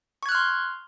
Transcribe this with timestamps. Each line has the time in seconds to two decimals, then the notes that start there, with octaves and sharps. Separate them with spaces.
0.23 C#6
0.26 G#6
0.29 F#6
0.32 F6
0.35 C6